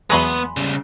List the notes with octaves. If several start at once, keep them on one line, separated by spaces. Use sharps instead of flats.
E2 F#3 G#3 B3 G#5 B5 C6
C#3 G3